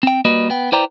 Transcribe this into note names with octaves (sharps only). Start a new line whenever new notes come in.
C4 G5
G3 A#3 F#4 B4 D#5
B3 G5
E4 B4 C5 D5 G5 A#5